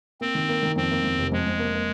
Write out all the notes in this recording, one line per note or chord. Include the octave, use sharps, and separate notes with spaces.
A#3 C4
D#3
A#3
D#3
F2 C4
A#3
F2
F1
F2 G#3
F2
A#3
A#3